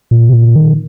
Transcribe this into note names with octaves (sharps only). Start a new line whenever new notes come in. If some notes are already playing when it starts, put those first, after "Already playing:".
A#2
C3
A#2
D#3